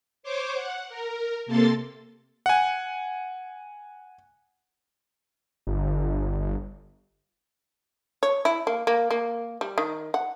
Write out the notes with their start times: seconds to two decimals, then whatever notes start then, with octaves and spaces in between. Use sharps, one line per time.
0.23 C5 C#5 D6
0.54 F#5
0.89 A#4
1.46 C3 A#3 A4 C6 A6
2.46 F#5 G#5
5.67 G1
8.23 C#5
8.45 E4
8.67 A#3
8.87 A#3
9.11 A#3
9.61 G3
9.78 D#3
10.14 F#5